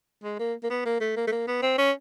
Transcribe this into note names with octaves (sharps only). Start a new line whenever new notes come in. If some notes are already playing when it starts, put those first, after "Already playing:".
G#3
A#3
A#3
B3
A#3
A3
A#3
A3
A#3
B3
C4
C#4